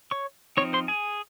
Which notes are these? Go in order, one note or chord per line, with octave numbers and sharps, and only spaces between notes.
C#5 C#6
F3 C4 D#4 C#5 C#6
C5 C6
G#4 G#5